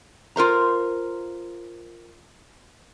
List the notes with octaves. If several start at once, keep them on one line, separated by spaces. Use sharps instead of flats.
F4 A#4 C5 A#5